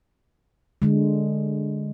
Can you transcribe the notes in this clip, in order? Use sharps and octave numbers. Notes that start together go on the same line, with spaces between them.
D3 G#3